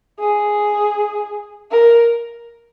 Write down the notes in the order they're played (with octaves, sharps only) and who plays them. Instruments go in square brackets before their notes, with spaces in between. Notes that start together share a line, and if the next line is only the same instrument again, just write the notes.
[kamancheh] G#4
A#4